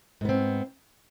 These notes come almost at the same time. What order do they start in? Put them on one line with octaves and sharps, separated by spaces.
G#2 B3 C4